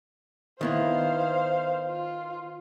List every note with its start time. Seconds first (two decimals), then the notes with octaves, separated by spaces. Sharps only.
0.61 D#3 B3 E4 C5 F5
1.87 F4